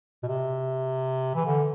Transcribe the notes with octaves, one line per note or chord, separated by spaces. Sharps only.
B2
C3
E3
D3